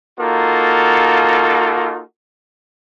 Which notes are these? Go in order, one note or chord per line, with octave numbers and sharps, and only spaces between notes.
A#3 D#4 F4 F#4 A4